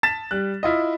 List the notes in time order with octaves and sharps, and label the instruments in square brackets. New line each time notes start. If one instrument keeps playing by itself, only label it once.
[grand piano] A5 A6 B6 E7
G3 F#6
E4 F4 D#5